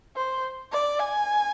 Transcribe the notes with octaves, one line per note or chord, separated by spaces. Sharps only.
C5
D5
G#5